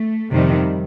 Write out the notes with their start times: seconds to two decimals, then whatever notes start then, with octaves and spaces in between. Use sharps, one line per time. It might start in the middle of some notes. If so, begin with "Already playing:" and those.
Already playing: A3
0.31 F2 C3 D#3 G3